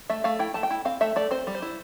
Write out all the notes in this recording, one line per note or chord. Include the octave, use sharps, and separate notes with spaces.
A3 E5
A3 F5
E4 G5
A3 A5
G5
E4
C4 F5
A3 E5
A3 D5
C4 C5
G3
C5
E4